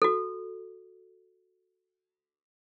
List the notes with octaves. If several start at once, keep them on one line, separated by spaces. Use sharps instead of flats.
F#4 A4